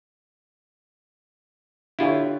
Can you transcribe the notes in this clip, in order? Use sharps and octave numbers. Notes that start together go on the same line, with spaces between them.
D3 E4 F4 G4 C#5